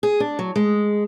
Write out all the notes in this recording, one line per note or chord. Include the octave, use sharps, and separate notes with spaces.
G#4
D4
F#3
G#3